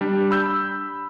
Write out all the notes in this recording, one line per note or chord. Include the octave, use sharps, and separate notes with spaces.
G3 D4
B5 E6 G6